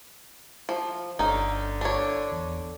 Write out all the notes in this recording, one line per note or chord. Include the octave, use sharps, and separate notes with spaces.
F3
G1 D3 C#4 D#4
D4 C#5
E2